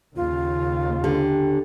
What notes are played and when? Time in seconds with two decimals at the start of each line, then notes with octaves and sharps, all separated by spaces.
0.16 D#2 C#3 F4
1.04 D3 G4